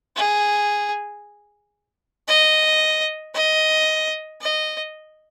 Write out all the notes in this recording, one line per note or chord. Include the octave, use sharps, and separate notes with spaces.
G#4
D#5
D#5
D#5